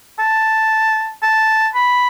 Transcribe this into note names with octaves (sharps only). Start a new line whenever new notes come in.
A5
A5
B5